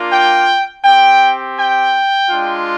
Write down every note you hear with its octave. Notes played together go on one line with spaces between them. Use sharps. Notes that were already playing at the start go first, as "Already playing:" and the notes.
Already playing: A#3 D4 F4
G5
C4 G4 G5
G5
G#3 D4 F4